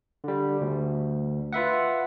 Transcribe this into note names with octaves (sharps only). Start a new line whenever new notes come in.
D3 G3
D2
F4 B4 E5 F#5